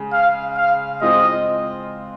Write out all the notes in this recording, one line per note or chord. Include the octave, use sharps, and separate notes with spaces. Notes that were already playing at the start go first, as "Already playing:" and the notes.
Already playing: C#3 G#3 C#4
F5
F5
G#3 C4 F4 C5 D#5